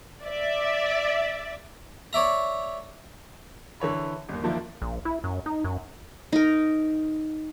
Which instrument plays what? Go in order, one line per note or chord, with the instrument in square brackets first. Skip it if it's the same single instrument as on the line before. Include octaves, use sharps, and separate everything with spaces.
[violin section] D5 E5
[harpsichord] C#5 D5 E5 A#5
[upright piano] D3 E3 C#5 B5
G1 D#2
D3 D#3 F3 A#3 D4 E4
[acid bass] A#1
E4
F#2
D#4
F#2
[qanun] D#4 A#4